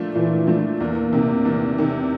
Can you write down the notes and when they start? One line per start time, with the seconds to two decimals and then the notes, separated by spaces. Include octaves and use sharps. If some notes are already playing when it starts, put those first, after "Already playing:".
Already playing: A#2 F3 A3 D4
0.15 A#2 E3
0.47 F3 A3 D4
0.81 E2 A#3
1.13 C3 D#3
1.45 E2
1.78 C3 D#3